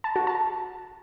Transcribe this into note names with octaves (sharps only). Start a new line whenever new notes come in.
A5
F#4
A5